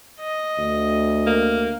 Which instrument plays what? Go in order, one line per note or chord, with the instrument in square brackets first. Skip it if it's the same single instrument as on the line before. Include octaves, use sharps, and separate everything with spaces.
[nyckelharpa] D#5
[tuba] D2
[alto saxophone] A#3